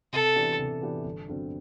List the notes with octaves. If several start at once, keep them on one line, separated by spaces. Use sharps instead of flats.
C3 A4
E3 B3 D4 G4
C3
E3 B3 D4 G4
G1
G2 D3 F#3 C4